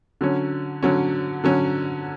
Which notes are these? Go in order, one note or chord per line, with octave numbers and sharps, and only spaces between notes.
D3 F#3 C#4
D3 F#3 C#4
D3 F#3 C#4